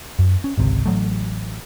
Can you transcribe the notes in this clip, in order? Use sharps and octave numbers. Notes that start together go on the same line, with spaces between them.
F#2
C#4
G#1 C#2 C3
A1 C#3 F#3 A3